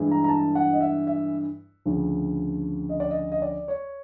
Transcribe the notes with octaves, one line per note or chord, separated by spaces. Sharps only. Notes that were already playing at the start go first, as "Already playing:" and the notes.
Already playing: G2 E3 G#3
A#5
A#5
A5
F#5
D#5
E5
E5
D2 C#3 F3
D#5
D5
D#5
D#5
D5
C#5